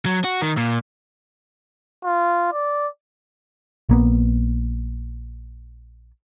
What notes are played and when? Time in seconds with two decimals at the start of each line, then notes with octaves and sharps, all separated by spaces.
0.06 F#3
0.24 F#4
0.42 D#3
0.57 A#2
2.04 F4
2.53 D5
3.89 A#1 A#3 B3